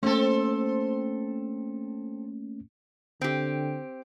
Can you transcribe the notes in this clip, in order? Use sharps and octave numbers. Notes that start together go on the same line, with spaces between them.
A3 A#3 C4 C#4 A4
D3 C4 G4